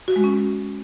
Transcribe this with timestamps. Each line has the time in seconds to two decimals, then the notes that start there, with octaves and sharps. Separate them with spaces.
0.08 F#4
0.16 G#3
0.24 C#4